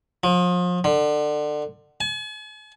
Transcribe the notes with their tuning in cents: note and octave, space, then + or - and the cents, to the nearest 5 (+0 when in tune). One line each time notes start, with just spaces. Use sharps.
F3 +35
D3 +25
G#5 +45